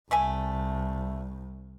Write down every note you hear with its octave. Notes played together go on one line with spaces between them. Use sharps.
C2 A3 E5 G#5